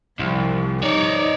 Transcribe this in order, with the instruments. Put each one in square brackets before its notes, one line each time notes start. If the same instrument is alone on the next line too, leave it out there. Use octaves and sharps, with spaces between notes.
[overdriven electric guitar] C2 [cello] F3
[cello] D#4 [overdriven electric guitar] C#5 D5